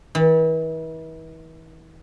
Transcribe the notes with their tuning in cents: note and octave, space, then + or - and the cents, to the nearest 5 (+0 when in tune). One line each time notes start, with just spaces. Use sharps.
E3 -40